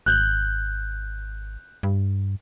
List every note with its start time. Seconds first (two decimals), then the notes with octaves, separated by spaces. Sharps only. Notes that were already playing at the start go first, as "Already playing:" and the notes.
0.06 G#1 F#6 G6
1.83 G2